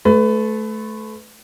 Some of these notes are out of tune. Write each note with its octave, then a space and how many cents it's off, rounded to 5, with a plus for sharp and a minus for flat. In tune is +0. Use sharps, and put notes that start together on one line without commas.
A3 -20 B4 +20